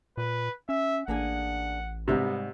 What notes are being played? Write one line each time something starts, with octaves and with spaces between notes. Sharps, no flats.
A#2 B4
C#4 E5
A1 A#3 D4 G#4 F#5
G#2 C3 G3 B3 D#4